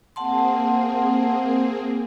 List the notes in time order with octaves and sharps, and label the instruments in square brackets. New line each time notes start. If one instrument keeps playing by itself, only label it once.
[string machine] A#3 C4 G#4 [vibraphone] F#5 A5 C6